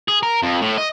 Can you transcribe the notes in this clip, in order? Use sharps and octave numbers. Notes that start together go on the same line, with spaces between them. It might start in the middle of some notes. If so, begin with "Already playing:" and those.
G#4
A#4
F2
A2
D#5